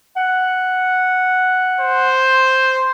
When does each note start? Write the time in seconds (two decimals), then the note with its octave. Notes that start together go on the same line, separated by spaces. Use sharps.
0.17 F#5
1.81 C5